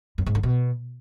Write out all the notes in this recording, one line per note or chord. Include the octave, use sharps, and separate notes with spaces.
F#2
G#2
D3
B2